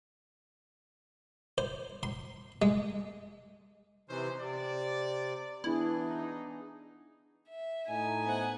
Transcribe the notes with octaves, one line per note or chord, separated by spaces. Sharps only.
C5
C6
G#3
C3 E3 C#4 D#4 C5
C3 D5
E3 B3 D4 E4 G#4
D#4
E5
A2 D#4 G#5
B3 C5 F#5